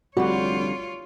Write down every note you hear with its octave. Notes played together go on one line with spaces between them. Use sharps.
F1 D3 G3 F4 F#4 C#5